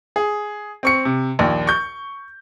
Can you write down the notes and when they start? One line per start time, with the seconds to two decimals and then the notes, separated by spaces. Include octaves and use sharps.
0.16 G#4
0.83 C4 C#6 C#7
1.05 C3
1.39 A#1 D#2
1.67 C#6 G6